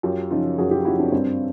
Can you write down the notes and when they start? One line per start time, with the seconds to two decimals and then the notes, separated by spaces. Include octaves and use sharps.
0.03 F#2 F4 G4
0.31 C#3 F3 D#4 F4
0.58 F#2 F#4 G#4
0.71 F4 G4
0.85 C#3 F3 E4 F#4
0.99 C4 D4
1.12 G2 C4 D4